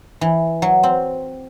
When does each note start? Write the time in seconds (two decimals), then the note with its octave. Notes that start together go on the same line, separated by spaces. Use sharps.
0.21 E3
0.62 F#3
0.83 C4